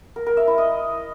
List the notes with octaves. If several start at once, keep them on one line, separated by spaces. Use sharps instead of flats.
A#4
A#4
E5
E4
D#5